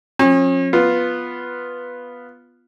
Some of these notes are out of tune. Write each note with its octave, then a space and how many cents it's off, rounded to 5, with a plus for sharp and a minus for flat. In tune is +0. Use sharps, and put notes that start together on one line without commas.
F3 +35 C#4 -40
B3 +0 F4 +0